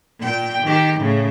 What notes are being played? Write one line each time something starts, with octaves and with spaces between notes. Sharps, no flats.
A#2 G5
D#3 G4
A2 C#3